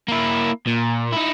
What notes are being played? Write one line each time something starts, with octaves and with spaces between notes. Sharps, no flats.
A#3 E4
A#2
D#4 E4